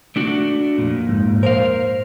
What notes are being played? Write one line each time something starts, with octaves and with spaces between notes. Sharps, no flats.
A3 D4 F#4
F2 A#2
G#2
A#4 C5 F5